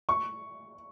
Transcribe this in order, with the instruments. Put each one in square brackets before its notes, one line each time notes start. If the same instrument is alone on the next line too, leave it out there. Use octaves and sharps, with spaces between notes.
[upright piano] C#6